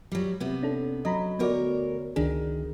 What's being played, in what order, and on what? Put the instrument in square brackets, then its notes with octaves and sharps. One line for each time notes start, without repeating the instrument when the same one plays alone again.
[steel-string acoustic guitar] F#3 G3
C3 B3
[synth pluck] C#4 D4 A4
[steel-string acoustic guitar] F#3 [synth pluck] D#5 A#5 B5
[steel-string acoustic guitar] D2 A#4 C#5 [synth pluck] B3 F#4 D5
[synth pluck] C#2 D4 G#4 [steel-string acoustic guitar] D#3